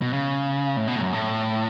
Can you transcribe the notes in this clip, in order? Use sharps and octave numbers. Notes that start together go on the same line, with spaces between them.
B2
C#3
A2
B2
A2
F#2
A2